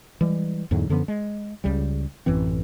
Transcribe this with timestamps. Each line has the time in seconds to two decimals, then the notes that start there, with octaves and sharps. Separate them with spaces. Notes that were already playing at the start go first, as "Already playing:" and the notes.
0.21 E3 G3 G#3
0.71 E2 G#2 D3 F#3
0.89 F#2 D3 F3 B3
1.08 G#3
1.64 C#2 C#3 G3
2.26 A1 F#2 E3 C4